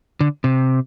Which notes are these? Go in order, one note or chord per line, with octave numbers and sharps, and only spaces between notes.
D3
C3